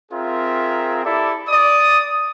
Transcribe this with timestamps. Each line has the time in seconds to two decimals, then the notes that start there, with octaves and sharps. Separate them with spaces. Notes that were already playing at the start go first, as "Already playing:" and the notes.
0.12 C4 F4 G#4 A#4 E5
1.04 E4 G4 A4 D5 E5
1.48 D5 D#6